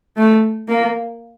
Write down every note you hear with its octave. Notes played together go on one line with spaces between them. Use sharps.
A3
A#3